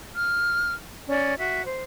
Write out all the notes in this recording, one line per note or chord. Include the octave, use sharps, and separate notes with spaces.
F6
C#4 D5
F#4 E5
C5